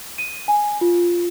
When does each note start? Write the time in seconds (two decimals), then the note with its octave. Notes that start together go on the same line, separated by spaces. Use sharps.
0.18 D#7
0.48 G#5
0.81 F4